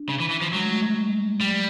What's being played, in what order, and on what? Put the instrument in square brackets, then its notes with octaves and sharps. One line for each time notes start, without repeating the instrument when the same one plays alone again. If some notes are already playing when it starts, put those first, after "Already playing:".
Already playing: [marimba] D4
[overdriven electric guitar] C#3
E3
E3
F3
[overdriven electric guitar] F#3 [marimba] G#3
[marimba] A3
A3
G#3
G3
G#3
[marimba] F#3 [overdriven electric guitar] G3